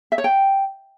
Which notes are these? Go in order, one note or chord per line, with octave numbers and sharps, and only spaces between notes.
E5
C#5
G5